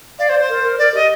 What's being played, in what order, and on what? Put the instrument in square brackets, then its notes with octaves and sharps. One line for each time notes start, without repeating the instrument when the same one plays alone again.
[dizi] D5 [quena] F5
[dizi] C5 [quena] D5
[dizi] C5
[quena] A#4
A#4
[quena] A#4 [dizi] D5
[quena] G4 [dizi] D#5